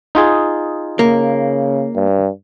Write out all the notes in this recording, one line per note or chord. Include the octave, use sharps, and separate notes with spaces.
D#4 F4 G#4
C#3 A#3
G2